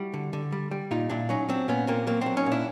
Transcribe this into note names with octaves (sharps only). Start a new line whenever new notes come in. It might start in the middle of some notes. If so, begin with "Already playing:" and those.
Already playing: G3 E4 F#4
D3
D3
G3
G3
A#2 D#4 F4
A#2 D4 E4
F#3 C#4 D#4
F#3 C4 D4
A#2 B3 C#4
A#2 A#3 C4
F#3 A#3 C4
F#3 C4 D4
C#4 D#4
A#2
D4 E4